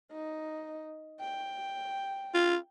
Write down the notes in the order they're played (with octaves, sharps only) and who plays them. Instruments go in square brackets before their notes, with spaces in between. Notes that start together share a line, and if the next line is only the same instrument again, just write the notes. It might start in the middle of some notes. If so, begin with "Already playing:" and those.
[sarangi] D#4
G5
[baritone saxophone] F4